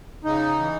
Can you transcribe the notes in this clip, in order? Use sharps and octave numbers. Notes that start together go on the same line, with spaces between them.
C#3 D#4
E3